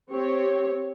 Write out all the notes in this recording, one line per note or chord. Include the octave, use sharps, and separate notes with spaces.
C4 G4 C#5